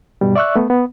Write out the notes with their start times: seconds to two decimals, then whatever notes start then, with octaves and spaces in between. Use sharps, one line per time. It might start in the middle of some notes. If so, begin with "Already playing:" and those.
0.21 G2 B2 G3
0.36 D5 E5 C#6 E6 F#6
0.56 A3 B3
0.70 B3